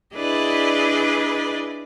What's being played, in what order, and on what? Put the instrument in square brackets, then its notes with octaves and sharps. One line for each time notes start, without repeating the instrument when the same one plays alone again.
[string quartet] D4 E4 G#4 B4 D5 D#5